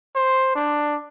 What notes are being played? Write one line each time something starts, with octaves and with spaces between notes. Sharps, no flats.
C5
D4